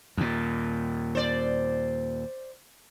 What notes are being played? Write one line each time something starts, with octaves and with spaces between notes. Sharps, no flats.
D#2 A#2
C5 D5